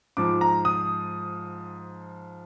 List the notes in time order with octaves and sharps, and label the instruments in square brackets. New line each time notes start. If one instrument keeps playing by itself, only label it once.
[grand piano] G#2 F3 D6
A#5
D#6